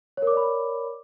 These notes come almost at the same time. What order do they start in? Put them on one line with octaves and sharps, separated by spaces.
C#5 A#4 D6 D5 B5